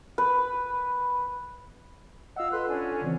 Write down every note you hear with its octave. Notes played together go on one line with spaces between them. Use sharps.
B4
F4 D#5 F5 F#5 E6
A4 B4 C6 F#6
C#4 D4 G#5
C#3 E3 C4